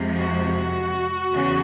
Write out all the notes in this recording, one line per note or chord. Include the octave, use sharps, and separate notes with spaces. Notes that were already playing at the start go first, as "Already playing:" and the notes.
Already playing: F2 C3 F3 G#3
F#4
E2 C#3